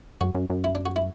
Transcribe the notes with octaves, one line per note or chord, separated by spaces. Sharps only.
F#2 F#4
F#2
F#2
E4
D4
F#4
E4